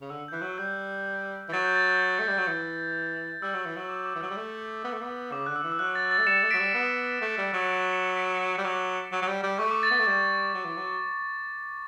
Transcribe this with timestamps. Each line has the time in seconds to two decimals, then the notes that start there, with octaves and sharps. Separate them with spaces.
0.01 C#3
0.10 D3 E6
0.28 G6
0.32 E3 F#6
0.42 F#3
0.58 G3 G6
1.49 E3
1.52 F#3 A6
1.65 G6
1.76 A6
1.88 G6
2.19 A3
2.28 G3
2.38 F#3
2.47 E3
3.42 G3 E6
3.54 F#3
3.66 E3
3.76 F#3
3.89 D6
4.06 D6
4.15 E3
4.21 F#3 E6
4.30 G3
4.37 A3
4.84 B3
4.93 A3
5.01 B3
5.32 C#3 D6
5.46 D3 F#6
5.56 E6
5.64 E3
5.72 E6
5.79 F#3 F#6
5.95 A6
6.11 A6
6.18 A3
6.27 G3 C#7 E7
6.43 A3
6.51 F#3 B6 D7
6.59 G3
6.74 B3
7.22 A3
7.38 G3
7.53 F#3
7.69 B6 D7
7.92 C#7 E7
8.16 B6 D7
8.41 F#6
8.58 G3
8.65 F#3 D6
9.12 F#3
9.22 F#3
9.28 G3
9.43 G3
9.59 A3 C#6
9.71 D6
9.83 A6
9.91 B3
9.99 A3
10.06 G3 D6
10.54 F#3
10.65 E3
10.77 F#3